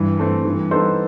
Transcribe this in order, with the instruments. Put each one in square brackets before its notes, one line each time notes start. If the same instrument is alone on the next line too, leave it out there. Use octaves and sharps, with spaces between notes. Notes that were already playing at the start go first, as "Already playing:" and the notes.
Already playing: [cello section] G2 [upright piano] E3
[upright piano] A3 C4
[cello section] G2 [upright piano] E3
[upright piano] B3 D#4 A4 C5